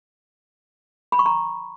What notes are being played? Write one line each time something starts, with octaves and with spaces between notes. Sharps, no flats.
B5
C#6
A#5